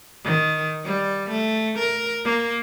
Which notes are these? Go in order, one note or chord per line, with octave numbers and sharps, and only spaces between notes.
D#3
G3
A3
A#4
A#3